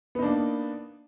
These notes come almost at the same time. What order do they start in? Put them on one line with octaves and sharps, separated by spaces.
B3 D#4 D4 A#3